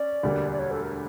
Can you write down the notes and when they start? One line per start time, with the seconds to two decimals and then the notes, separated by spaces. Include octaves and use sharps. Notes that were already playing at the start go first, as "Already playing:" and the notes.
Already playing: C#4 D5
0.23 E1 D2 D3 G3 A#3
0.51 D5
0.59 C#5
0.71 A4
0.82 A#4